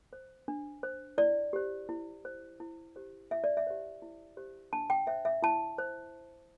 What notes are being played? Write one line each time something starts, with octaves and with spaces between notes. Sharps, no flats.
C5
D4
C5
E4 D5
G4 C5
E4
C5
E4
G4 C5
E4 E5
D5
E5
G4 C5
E4
G4 C5
D4 A5
G5
C5 E5
E5
E4 A5
C5